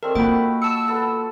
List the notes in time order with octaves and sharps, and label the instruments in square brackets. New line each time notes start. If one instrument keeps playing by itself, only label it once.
[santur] A3 C4 D#5 [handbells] A#4
[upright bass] A#3 [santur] F4 F#4 B5 [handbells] G5
[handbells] A5 C#7 [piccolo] E6
[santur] B3 A4